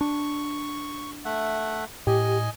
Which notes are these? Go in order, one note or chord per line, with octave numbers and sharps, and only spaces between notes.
D4 C#6
A3 E5 F#5
A2 G4 D#5 G#5